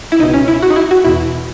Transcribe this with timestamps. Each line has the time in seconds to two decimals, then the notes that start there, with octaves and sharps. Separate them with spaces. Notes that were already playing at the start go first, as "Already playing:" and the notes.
0.12 E4
0.19 C#2 D#4
0.23 B2
0.34 C#4
0.48 E4
0.62 F#4
0.70 D#4
0.76 E4
0.91 F#4
1.04 E2 B2 E4